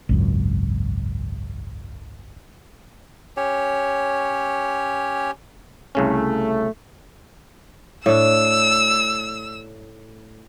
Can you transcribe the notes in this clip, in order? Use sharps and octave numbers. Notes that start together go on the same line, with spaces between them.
G#1 C#2 F#2
C#4 G4 C#5
C2 C#3 A3 C#4
A2 D4 E6